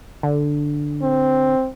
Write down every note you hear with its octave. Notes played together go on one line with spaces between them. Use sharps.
D3
C4